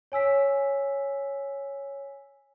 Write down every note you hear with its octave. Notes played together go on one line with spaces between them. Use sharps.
C#5 G#5 E6 B6